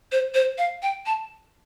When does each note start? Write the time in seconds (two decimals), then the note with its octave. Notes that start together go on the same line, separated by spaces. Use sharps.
0.12 C5
0.34 C5
0.58 F5
0.83 G5
1.06 A5